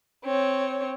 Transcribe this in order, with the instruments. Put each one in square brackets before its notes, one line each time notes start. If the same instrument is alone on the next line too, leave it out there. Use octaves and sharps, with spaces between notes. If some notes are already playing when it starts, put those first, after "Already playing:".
[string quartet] C4 C#5